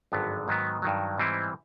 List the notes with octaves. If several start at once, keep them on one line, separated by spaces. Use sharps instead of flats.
G#1 G2 D3 F#3 B3
G#2 D#3 F#3 B3
G2 D#3 F#3
G#2 E3 G3 C4 E4